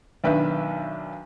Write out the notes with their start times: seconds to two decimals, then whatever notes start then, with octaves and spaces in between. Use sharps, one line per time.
0.24 B1 D#3 D4 B4 E5